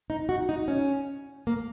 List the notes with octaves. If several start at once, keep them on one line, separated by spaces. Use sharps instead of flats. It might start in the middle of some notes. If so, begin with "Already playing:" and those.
D#4
F#4
D#4
C#4
A#3